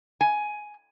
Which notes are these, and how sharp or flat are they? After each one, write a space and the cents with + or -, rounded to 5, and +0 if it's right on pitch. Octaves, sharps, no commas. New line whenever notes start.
G#5 +10